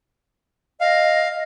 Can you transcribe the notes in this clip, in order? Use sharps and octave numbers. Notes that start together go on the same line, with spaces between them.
D#5 F5